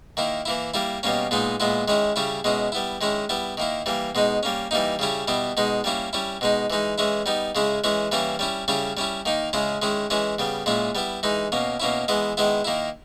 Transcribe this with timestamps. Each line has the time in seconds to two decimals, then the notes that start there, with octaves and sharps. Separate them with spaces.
0.17 D#3 A#3 E4
0.46 E3 A#3 E4
0.74 G3 A#3 E4
1.03 B2 G3 A#3 C#4
1.31 A#2 G#3 B3 D#4
1.60 A#2 G#3 B3 E4
1.88 D#3 G#3 C#4 E4
2.16 C#3 G3 C#4 E4
2.44 B2 G#3 C#4 E4
2.72 G3 B3 E4
3.01 D#3 G#3 C#4 E4
3.29 G3 B3 E4
3.57 D#3 A#3 E4
3.86 E3 G3 A#3
4.15 B2 G#3 D#4
4.43 G3 A#3 C#4
4.71 E3 G3 A#3 D#4
4.99 C#3 G3 C#4 E4
5.28 B2 G3 B3 E4
5.57 B2 G#3 D#4
5.84 G3 A#3 C#4 E4
6.13 G3 C#4 E4
6.41 B2 G#3 D#4
6.70 E3 G#3 D#4
6.98 E3 G#3 C#4 E4
7.26 G3 B3 D#4
7.55 C#3 G#3 C#4 E4
7.84 E3 G#3 C#4 E4
8.12 E3 G3 A#3 C#4 E4
8.39 G3 C#4 E4
8.68 C#3 G3 C#4 E4
8.97 G3 C#4 E4
9.25 D#3 A#3 D#4
9.53 C#3 G#3 C#4 E4
9.82 D#3 G#3 C#4 E4
10.10 E3 G#3 C#4 E4
10.39 C#3 G3 B3
10.66 A#2 G#3 C#4 E4
10.95 G3 B3 E4
11.23 E3 G#3 D#4
11.52 B2 A#3 C#4
11.80 B2 A#3 C#4 E4
12.08 E3 G#3 B3 E4
12.37 D#3 G#3 B3 E4
12.65 D#3 A#3 E4